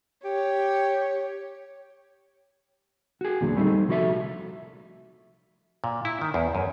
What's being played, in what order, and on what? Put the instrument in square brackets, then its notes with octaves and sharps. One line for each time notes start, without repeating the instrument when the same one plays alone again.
[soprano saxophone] G4 [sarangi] C#5
[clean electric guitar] F#4 G#4
E2 A#2 D3 F#3
G3 A3 C4 D#4
C2 F3 F#4 A4 E5
[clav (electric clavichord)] A#2
E4
D#3
E2
F#2